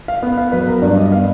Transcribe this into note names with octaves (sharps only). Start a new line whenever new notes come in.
F5
B3
F5
F#3 B4
A#4
G2 D5
D#5
B3 F5